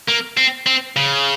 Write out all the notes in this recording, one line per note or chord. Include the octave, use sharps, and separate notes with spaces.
A#3
C4
C4
C#3